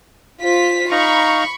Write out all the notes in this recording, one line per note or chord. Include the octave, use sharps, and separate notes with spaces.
F4 C5 B6
D#4 F5 A#5 B5 C#6